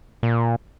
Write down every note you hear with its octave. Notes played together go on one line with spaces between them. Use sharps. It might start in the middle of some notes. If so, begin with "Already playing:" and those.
A#2